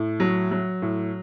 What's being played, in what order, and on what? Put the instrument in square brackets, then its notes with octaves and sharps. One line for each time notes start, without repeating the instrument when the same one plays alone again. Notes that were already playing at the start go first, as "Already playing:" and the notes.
Already playing: [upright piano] A2
F#3
F#3
A2